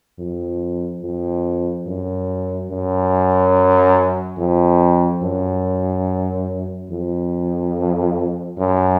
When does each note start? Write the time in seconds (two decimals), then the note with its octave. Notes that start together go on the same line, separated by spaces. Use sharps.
0.19 F2
1.02 F2
1.86 F#2
2.70 F#2
4.38 F2
5.22 F#2
6.90 F2
8.58 F#2